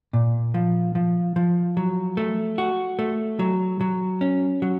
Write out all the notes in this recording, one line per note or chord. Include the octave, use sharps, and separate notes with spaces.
A#2
F3
F3
F3
F#3
A3
F#4
A3
F#3
F#3
C#4
F#3